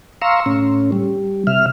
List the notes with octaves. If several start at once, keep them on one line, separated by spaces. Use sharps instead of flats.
F5 A#5 C6 C#6 E6
A2 C#4
G3
C3 E5 F6